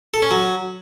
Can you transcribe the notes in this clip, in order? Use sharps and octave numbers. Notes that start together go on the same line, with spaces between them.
A4
C#4
F#3